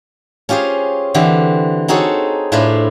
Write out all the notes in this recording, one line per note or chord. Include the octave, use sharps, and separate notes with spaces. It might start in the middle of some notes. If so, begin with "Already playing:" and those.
C#4 F4 G4 G#4 C5
D3 E3 C4 G4
C4 D#4 F#4 G#4 A4 C#5
A2 D4 E4 F4 B4 C5